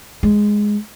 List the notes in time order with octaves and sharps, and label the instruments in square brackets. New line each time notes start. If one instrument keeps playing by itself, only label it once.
[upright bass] G#3